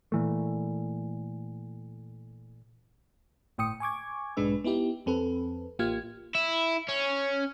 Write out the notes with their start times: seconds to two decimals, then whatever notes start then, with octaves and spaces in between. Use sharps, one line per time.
0.12 A#2 E3 A3
3.58 G1 A2 G5 D#6 C#7
3.80 G#5 C#6 D6 G#6
4.37 B1 G#2 G#3 D4 B4 E6
4.64 B3 D#4 E4 G4
5.06 F2 C4 A4 B4
5.79 A1 A#3 F4 G4 F6 G#6
6.35 E4
6.89 C#4